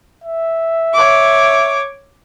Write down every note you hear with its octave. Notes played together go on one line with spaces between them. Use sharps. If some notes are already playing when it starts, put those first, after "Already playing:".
E5
C#5 D6